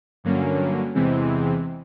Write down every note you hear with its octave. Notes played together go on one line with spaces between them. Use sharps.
G2 D3 F#3 A#3 C#4
E2 C3 E3 G#3 C4